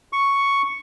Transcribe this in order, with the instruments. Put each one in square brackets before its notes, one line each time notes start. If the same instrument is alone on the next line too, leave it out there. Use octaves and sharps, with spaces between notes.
[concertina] C#6